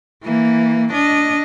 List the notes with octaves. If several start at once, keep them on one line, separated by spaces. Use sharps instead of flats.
E3 A#3
D4 D#5